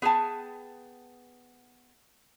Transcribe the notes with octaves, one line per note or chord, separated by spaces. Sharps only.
B3 G#4 G5 A5